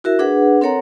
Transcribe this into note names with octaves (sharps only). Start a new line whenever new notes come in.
E4 F#4 A#4 E5
D4 G#4 B4 F#5
C4 A4 A#4 C#5 F#5 A#5